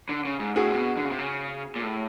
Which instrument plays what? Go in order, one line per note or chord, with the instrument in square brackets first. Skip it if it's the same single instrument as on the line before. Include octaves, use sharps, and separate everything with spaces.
[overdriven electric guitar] D3
C#3
G#2
[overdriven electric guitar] A2 [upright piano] F#4 G#4
[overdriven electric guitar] C3
B2
D3
C#3
C3
C#3
A#2
A2